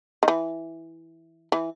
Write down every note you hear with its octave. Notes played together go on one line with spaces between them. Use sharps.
D#3
E3
E3